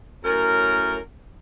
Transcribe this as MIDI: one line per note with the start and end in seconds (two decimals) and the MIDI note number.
0.25 0.98 42
0.25 0.98 45
0.25 0.98 70